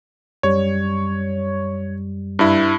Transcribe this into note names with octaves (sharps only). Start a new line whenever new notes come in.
F#2 G3 C#5
G2 E4